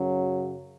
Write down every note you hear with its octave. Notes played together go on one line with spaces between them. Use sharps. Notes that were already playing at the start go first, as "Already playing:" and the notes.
Already playing: F#2 C#3 F#3